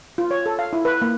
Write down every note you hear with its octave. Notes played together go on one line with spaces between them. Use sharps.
F4
C#5
A4
F5
E4
B4
A#3